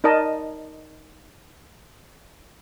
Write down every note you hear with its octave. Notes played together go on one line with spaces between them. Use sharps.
D#4 A#4 D5 D#5 A5